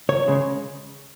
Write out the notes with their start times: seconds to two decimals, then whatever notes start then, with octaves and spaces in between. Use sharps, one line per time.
0.09 C#2 C#5
0.28 C#3 G#3